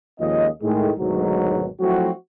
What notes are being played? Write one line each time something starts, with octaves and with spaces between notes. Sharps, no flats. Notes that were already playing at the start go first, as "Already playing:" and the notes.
D#2 F3 G#3 C#4 D#5
A2 D#3 G#3
G#1 D2 G#2 B2 F#3
F3 F#3 A3 C4 E4 F#4